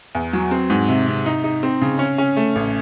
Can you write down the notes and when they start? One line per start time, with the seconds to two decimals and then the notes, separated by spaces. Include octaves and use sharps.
0.15 E2
0.33 F#3
0.51 C4
0.70 G#2
0.88 C3
1.07 C3
1.26 D#4
1.44 D#4
1.63 C4
1.82 C#3
1.99 C#4
2.18 C#4
2.37 A3
2.56 A1